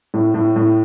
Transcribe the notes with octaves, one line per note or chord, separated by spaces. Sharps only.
A2
A2
A2